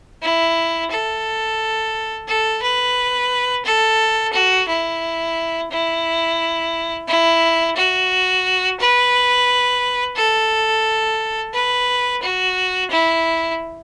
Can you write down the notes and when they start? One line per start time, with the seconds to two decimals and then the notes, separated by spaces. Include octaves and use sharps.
0.22 E4
0.91 A4
2.28 A4
2.62 B4
3.65 A4
4.33 F#4
4.68 E4
5.71 E4
7.07 E4
7.76 F#4
8.80 B4
10.16 A4
11.53 B4
12.22 F#4
12.90 E4